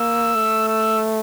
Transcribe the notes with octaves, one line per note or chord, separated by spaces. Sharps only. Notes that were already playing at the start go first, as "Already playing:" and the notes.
Already playing: A#3 E6
A3
E6